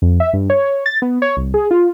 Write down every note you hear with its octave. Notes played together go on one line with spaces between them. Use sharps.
F2
E5
G2
C#5
A6
B3
C#5
C2
G#4
F4